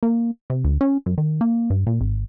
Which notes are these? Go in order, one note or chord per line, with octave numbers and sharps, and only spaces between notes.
A#3
C3
D2
C#4
F#2
D#3
A#3
G2
A#2
G#1